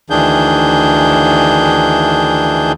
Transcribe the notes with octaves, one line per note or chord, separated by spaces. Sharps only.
D2 D#3 E3 D4 G#4 G6